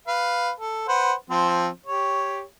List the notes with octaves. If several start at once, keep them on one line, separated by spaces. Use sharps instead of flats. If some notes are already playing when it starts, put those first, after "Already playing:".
B4 F5
A4
B4 C5 F#5
F3 C4 C5
G4 C#5